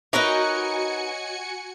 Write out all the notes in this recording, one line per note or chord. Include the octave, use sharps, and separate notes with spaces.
D#4 F#4 A#4 B4 C#5 D#5 G#5 C#7